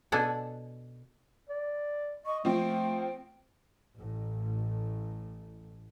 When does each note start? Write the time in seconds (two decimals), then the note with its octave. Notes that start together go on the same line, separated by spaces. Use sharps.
0.12 B2 D4 A4 F#5 G#5
1.50 D5
2.26 D#5 C#6
2.45 F3 A3 C4 G5
3.97 A1 A2